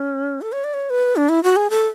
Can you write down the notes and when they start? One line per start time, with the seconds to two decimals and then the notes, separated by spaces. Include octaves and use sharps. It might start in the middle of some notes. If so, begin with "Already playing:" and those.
Already playing: C#4
0.41 A4
0.52 C#5
0.64 D5
0.74 C#5
0.90 B4
1.16 D4
1.29 E4
1.43 F#4
1.56 G#4
1.70 A4